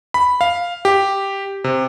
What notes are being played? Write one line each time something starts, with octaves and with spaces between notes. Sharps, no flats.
B5
F5
G4
C3